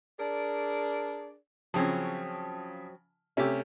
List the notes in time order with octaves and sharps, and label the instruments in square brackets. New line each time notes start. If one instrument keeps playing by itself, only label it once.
[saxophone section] D4 G#4 A#4 D5
[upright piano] C#3 F3 [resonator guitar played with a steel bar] F#3 C4 C#4
[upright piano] C3 A3 C#4 [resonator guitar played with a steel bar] G4 E5